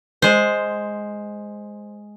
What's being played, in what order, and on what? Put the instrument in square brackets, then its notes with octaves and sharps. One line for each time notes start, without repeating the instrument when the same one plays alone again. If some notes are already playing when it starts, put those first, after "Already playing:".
[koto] G#3 C5